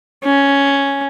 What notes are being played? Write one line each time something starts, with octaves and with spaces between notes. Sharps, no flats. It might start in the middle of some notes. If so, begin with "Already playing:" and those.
C#4